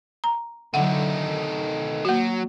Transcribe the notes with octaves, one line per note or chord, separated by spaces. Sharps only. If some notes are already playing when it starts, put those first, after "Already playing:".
A#5
D3 F#3 A3 D#4 F#5
D#3
F#3 A#3 F#4